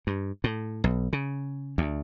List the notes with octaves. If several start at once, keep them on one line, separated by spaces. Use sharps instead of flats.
G2
A2
B1
C#3
D2